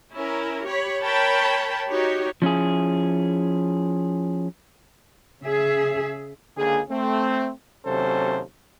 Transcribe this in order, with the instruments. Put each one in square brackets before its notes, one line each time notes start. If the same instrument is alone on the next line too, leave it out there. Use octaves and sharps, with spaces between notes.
[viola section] C#4 E4 A#4
G4 C#5 B5
A#4 C#5 G5 A5 B5
D#4 F#4 G4 C#5
[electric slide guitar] F3 C#4 E4 G#4
[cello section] C#3 G#4 E5
[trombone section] C#2 D3 A#3 G#4
A3 C4
D#2 C3 F#3 C#4 A4 C5